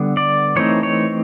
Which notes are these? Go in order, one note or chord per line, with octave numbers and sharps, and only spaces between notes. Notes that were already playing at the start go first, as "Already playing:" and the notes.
Already playing: D3 G3 B3
D5
E3 A3 C4 D#4 C#5
C#5